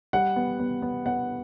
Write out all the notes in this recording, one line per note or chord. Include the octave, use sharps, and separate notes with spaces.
G3 F#5
B3
B3
B3
B3 F#5